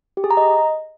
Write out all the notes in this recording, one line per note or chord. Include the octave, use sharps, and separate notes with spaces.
G4
G#4
A#5
D#5